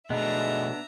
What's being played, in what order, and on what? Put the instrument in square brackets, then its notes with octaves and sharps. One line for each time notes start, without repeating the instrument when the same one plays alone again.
[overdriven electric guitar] B2 A3 [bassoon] G#3 [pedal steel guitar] B3 D4 [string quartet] E5 A#5